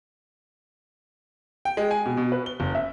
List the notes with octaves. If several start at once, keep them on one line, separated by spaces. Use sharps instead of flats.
G5
G#3
G#5
B2
B2
B4
G7
F#1
E5